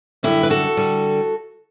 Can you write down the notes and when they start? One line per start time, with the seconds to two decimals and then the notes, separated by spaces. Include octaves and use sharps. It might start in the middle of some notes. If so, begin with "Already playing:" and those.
0.23 F#2 D3 G3 E4 G4
0.43 B4
0.50 F#4 A4
0.77 D3 G3